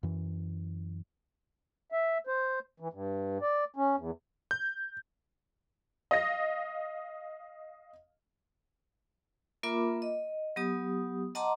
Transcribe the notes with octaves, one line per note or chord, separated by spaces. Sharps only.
F#2 E3
E5
C5
E3
G2
D5
C#4
E2
G6
D#5 F5 A#6
A#3 F4 A#4 E5 B5 D6
D#5
F#3 B3 G4 D#6
D#5 F#5 A5 A#5 C6 D6